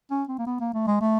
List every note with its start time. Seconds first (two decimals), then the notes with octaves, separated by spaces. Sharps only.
0.11 C#4
0.29 C4
0.38 A#3
0.46 B3
0.60 A#3
0.74 A3
0.87 G#3
1.01 A3